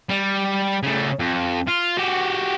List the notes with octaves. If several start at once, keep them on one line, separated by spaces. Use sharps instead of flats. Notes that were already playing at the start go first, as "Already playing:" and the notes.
G3
C#3 A3
F2
F4
F#4 G4